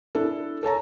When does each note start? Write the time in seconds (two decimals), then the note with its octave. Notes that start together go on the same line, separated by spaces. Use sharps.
0.15 D4 E4 A4
0.63 A4 C#5 A5 A#5